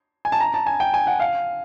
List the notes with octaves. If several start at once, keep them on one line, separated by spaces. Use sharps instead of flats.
G#5
A5
A#5
A5
G#5
G5
G#5
F#5
F5